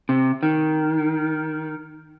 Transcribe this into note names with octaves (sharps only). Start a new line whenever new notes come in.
C3
D#3